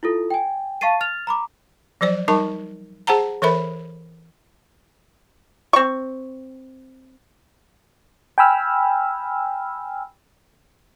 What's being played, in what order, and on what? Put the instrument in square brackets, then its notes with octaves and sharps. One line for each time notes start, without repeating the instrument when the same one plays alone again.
[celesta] E4 F4 A4
G5 G#5
F5 A5 C#6 A6 C7 D#7
F6 A6 F7
A#5 B5 D6
[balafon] F3 F#3 C5 D5
G3 D#4 A#4 A5 C#6
G#4 C5 F#5 A5 A#5
E3 A4 A#4 C5 E5 B5
[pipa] C4 C#6
[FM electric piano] G5 G#5 B5 E6 F6